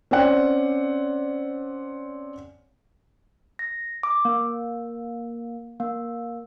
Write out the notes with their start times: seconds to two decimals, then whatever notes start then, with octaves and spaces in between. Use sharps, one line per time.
0.11 C4 C#4 D5 F#5
3.59 A#6
4.03 D6
4.25 A#3
5.80 A#3